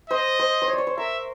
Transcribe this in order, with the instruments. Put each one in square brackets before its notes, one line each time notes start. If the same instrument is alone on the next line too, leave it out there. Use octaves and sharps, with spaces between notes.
[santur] C5 [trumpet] D#5
[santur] C5
C5
C#5
D5
C#5
C5
[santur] A#4 [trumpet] E5